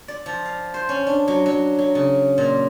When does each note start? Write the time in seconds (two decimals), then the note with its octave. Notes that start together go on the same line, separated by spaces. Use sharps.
0.08 D5
0.26 F3
0.45 F5
0.74 C5
0.89 C#4
1.07 D4
1.28 F#3
1.46 F#3
1.79 F#3
1.95 C#3
2.38 A#2